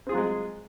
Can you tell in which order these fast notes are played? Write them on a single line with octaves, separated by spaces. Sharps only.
C4 G#4 F4 F#3 G#3